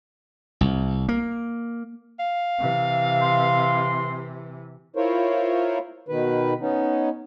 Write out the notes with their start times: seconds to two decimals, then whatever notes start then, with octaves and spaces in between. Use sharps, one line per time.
0.61 C2
1.09 A#3
2.19 F5
2.58 C3 E3
3.22 C6
4.96 E4 F4 A#4 C5 C#5
6.08 B2 D#3 B4
6.60 B3 C#4 D#4